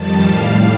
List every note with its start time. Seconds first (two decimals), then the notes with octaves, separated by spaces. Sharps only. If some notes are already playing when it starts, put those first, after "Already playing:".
Already playing: F2 D#3 G3 A5
0.24 A2 G3 F5